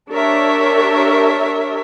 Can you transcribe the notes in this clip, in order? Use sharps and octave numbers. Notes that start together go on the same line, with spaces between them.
D4 G4 A#4 C#5 E5